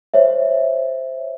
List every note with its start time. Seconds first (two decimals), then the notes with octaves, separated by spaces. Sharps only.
0.14 C5 C#5 E5